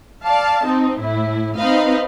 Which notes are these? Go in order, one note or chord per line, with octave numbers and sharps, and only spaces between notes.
D5 F5 A5
C4 D#4
A2 E4
C4 D#4 B4 D#5 F5